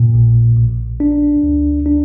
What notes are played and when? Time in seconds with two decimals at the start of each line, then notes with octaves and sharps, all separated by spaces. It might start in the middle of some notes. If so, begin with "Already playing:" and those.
Already playing: A#2
0.14 A#1
0.56 A#1
1.00 D4
1.43 D2
1.86 D4